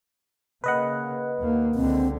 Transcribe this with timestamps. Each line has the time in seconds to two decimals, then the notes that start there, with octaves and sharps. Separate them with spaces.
0.64 C#3 A#3 B4 D#5 F#5
1.40 D#2 A#3
1.75 C#2 D3 C4